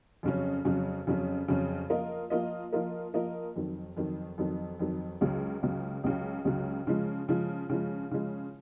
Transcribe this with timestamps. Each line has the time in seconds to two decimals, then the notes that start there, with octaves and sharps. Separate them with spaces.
0.23 F2 C#3 F#3 C#4
0.65 F2 C#3 F#3 C#4
1.07 F2 C#3 F#3 C#4
1.48 F2 C#3 F#3 C#4
1.90 F3 A#3 F4 A#4 D#5
2.30 F3 A#3 F4 A#4 D#5
2.72 F3 A#3 F4 A#4 D#5
3.14 F3 A#3 F4 A#4 D#5
3.56 F2 D#3 F#3
3.97 F2 D#3 F#3
4.38 F2 D#3 F#3
4.79 F2 D#3 F#3
5.21 C#2 C#3 F#3
5.63 C#2 C#3 F#3
6.04 C#2 C#3 F#3
6.45 C#2 C#3 F#3
6.87 C#3 F3 G#3
7.29 C#3 F3 G#3
7.69 C#3 F3 G#3
8.11 C#3 F3 G#3